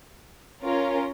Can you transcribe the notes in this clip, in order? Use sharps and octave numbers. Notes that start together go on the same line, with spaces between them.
C#4 F4 A#4